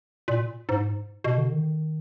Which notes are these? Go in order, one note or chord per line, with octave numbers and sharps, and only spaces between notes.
A#2
G#2
B2
D3
D#3